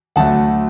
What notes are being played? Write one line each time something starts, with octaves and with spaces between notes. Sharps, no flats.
D2 D3 F#3 A3 F#5 A5